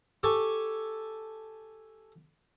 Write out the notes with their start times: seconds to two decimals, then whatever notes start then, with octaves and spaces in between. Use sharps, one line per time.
0.23 G4 A4 G#5 A5 C#6